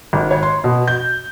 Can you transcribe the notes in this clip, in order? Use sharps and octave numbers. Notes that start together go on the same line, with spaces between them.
G#1
C#5
C6
B2
G6